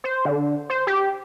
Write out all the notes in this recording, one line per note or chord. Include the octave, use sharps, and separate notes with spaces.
C5
D3
C5
G4